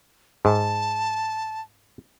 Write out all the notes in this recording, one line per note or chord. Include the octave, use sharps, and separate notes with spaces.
G#2 A5